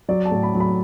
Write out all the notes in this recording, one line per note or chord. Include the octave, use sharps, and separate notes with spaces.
F#3 D5
A5
A2
B5
F#3
B5